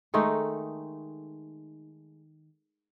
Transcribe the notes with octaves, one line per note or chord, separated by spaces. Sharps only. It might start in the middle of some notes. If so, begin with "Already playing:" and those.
D#3 G#3 A3 D#4